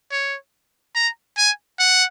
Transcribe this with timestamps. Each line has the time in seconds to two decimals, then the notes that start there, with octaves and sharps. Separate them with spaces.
0.11 C#5
0.95 A#5
1.37 G#5
1.79 F#5